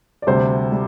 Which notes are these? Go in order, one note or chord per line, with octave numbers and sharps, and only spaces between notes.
D5
D2 C3 G3 C5
G3